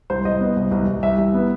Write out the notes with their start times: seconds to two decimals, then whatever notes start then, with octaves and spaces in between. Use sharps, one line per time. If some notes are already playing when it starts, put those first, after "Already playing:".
0.10 C2 C5
0.25 C2 D#5
0.40 B3
0.56 C2
0.71 C2
0.87 C2
1.03 C2 E5
1.18 C2
1.34 B3